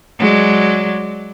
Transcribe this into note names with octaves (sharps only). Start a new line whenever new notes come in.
F#3 G#3 D5